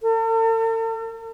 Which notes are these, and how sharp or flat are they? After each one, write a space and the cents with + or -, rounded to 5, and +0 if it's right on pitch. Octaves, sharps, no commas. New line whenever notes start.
A4 +45